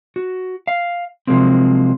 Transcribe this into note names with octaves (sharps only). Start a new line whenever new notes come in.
F#4
F5
C3 F3 F#3 G#3 A#3 C4